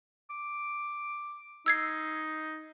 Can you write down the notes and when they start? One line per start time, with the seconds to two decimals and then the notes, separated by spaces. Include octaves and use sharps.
0.30 D6
1.66 D#4 E6 G#6 C7